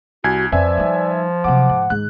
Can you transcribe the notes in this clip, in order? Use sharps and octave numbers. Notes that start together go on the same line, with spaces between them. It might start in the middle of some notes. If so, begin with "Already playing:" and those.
C2 F#4 G#5 G#6
F2 F3 B4 D5 E5 G#5
G3 D#4
C3 F#3 F#5 D6
G#2
G#2 D#3 F#6